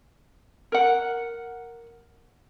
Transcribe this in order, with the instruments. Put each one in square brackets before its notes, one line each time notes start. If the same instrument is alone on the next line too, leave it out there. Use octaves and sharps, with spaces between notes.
[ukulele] A#4 F#5